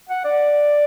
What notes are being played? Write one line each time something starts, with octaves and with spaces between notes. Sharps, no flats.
F#5
D5